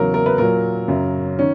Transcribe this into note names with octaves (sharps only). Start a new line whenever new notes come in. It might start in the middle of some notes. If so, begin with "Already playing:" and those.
Already playing: E2 C#3 F#3 A#4
A#4
B4
A#2 F#3 A#4
F#2 C#3 F#3
D#3 C#4